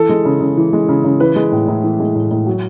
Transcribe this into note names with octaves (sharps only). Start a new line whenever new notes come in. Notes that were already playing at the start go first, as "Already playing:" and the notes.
Already playing: E3 A4
G#3
C#3
C#3
E3
G#3
C#3
C#3
E3 B4
G#3
A2
A2
E3
G#3
A2
A2
F#3